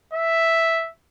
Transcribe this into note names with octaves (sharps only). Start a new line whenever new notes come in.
E5